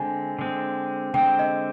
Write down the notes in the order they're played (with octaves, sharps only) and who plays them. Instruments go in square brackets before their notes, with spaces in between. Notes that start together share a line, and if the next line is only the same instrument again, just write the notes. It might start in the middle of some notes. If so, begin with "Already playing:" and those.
Already playing: [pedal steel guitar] D3 G#3 C4 [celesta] G#5
[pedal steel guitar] D3 G#3 C4
[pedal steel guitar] D3 G#3 C4 [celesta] G5
[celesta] D#5